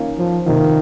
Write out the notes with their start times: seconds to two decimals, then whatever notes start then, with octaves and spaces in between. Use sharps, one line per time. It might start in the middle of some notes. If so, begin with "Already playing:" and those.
Already playing: D#3 A#3 C#4 F4
0.18 F3
0.46 C3 D#3 F3 A#3 F4